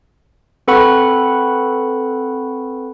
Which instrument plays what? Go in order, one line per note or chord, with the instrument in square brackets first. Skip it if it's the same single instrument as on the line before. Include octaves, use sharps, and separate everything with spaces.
[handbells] C4 A4 B4 F#5 B5 C#6